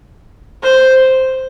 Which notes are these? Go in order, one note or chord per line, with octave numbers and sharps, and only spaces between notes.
C5